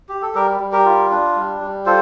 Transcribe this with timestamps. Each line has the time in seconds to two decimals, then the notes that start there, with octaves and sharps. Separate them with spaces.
0.09 G4
0.22 A4
0.35 G3 G4 A#4
0.60 G3
0.72 G4 A#4
0.85 F4
1.11 D4
1.36 G3
1.61 G3
1.86 F4 A4 C5